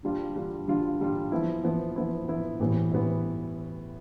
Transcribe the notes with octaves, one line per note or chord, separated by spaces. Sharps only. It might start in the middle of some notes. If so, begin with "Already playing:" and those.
D3 G3 D4 F4
D3 G3 D4 F4
D3 G3 D4 F4
D3 G3 D4 F4
F3 B3 E4
F3 B3 E4
F3 B3 E4
F3 B3 E4
A2 E3 G3 B3
A2 E3 G3 B3